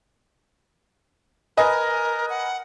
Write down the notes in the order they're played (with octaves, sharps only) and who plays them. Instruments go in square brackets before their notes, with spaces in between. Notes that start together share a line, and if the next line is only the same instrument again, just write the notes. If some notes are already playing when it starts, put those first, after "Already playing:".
[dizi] A#4 [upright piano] B4 D#5 G#5
[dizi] F#5